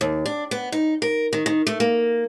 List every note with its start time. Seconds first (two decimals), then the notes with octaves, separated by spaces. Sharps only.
0.01 D#2
0.26 D4
0.51 B3
0.72 D#4
1.02 A#4
1.33 D#3
1.46 D#3
1.67 A3
1.80 A#3